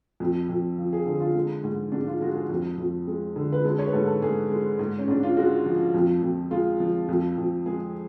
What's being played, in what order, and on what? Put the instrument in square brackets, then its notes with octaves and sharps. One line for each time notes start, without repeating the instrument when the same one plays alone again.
[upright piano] F2
F2
F3
G#4
D3 G#4
F4
G#3
G#2
G#2 D4
F4
G#3 F#4
G#4
F2
F2
G#3
D3
B4
G#3 A4
C#5
B4
G#2 A4
A4
G#2 G#4
G#3
G#2
C#4
G#2 D4
F4
G#3 F#4
F3
F2
F2
G#3 F4
F3
F2
F2
G#3 G#4